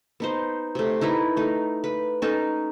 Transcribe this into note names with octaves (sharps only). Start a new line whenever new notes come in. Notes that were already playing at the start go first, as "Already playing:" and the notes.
B3 D#4 C5
C3 A3
D#4 E4 A#4 B4
A3 D#4
B4
C#4 D#4 A4